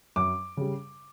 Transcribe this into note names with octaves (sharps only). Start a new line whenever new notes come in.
F#2 D6
C#3 G3